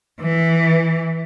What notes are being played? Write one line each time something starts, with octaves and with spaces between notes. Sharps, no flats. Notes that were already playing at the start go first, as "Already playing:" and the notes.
E3